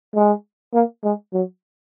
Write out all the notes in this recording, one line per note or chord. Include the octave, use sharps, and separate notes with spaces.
G#3
A#3
G#3
F#3